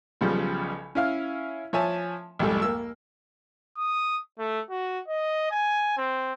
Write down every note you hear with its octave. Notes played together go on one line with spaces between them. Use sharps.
B1 C#3 F3 G3
C#4 E4 F5 F6
F3 C#5 E5 G#5 A5
C2 F2 G#2 G3 A3
A#3 E6
D#6
A3
F#4
D#5
G#5
C4